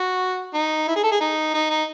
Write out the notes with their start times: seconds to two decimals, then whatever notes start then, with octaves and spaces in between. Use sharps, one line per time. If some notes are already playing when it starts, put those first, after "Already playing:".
Already playing: F#4
0.54 D#4
0.88 E4
0.96 G#4
1.03 A4
1.12 G#4
1.20 D#4
1.54 D#4
1.70 D#4